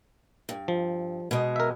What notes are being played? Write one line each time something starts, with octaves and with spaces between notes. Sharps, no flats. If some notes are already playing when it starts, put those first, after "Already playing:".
G2
F3
B2 G#3
A#4 E5